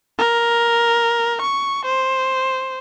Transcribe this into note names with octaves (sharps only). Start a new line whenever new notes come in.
A#4
C#6
C5